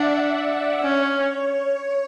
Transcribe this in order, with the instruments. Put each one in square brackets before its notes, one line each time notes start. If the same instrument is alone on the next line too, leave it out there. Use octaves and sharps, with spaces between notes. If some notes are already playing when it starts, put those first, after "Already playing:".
Already playing: [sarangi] D4 [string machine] D5 E5 F#5
[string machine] D5
[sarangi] C#4 [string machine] C#5